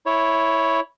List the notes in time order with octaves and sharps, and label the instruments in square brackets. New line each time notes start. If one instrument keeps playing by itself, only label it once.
[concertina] E4 C#5